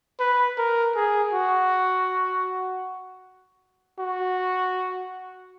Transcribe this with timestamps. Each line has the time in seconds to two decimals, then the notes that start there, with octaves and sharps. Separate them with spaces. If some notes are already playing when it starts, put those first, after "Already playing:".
0.20 B4
0.58 A#4
0.96 G#4
1.34 F#4
3.99 F#4